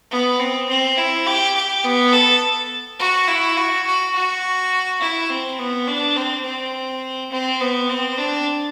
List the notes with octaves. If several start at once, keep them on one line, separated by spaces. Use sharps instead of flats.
B3
C4
C4
E4
G4
G4
B3
A4
F#4
E4
F#4
F#4
F#4
E4
C4
B3
D4
C4
C4
C4
B3
C4
D4